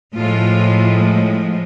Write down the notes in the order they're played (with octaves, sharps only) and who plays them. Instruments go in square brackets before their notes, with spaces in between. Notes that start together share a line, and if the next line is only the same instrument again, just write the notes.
[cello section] A2 F3 G#3 F4